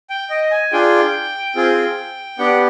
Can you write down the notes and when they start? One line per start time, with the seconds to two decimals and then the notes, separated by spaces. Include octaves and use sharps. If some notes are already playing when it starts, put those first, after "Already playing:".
0.10 G5
0.30 D#5
0.51 G#5
0.72 D4 F4 G#4 G5
1.56 C4 F4 G#4
2.39 B3 D4 G4 F#5